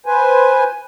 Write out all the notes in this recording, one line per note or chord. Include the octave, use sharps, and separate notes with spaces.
B4 C5 G#5